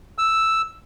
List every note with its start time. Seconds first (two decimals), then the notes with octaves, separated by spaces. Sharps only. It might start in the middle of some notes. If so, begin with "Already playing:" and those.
0.18 E6